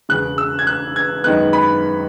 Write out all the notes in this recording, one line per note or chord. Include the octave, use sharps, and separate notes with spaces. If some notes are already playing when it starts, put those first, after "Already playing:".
E1 E2 C#3 F#6
E6
G#6
F#6
G#6
F#2 D#3 G#3 B3 F#6
B5